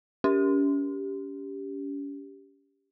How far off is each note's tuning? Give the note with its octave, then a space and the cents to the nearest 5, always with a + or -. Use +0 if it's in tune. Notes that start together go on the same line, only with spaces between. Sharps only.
C#4 +35 G4 +0